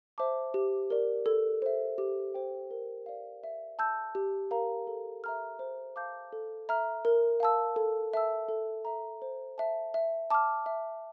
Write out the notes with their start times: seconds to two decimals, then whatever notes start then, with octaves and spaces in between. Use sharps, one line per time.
0.18 C5 E5 A5 D6
0.54 G4
0.90 A#4 D5
1.26 A4
1.62 C5 E5
1.98 G4
2.34 C5 G5
2.71 A#4
3.06 D5 F5
3.44 E5
3.79 A5 E6 G6
4.15 G4
4.51 A#4 F5 A#5
4.87 A4
5.24 E5 A#5 F6
5.59 C5
5.96 F5 A5 D6 G6
6.33 A4
6.69 E5 A#5 F6
7.05 A#4
7.40 F5 A5 E6
7.76 A4
8.14 E5 A5 E6
8.49 A4
8.85 E5 A#5
9.22 C5
9.58 E5 A5
9.94 E5
10.30 A5 D6 F6
10.66 E5